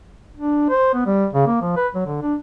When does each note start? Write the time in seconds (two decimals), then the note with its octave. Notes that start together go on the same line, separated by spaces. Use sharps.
0.37 D4
0.70 C5
0.94 B3
1.06 G3
1.33 C#3
1.47 A#3
1.61 F3
1.76 B4
1.94 F#3
2.06 D3
2.22 D4